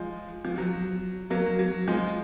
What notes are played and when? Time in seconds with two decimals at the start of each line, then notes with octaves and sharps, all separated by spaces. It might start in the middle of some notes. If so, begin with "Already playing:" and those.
Already playing: F3 G#3
0.45 F3
0.58 F#3
1.30 F#3 A#3
1.59 F#3
1.88 F3 G#3